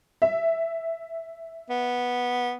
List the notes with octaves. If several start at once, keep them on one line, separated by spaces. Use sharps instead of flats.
E5
B3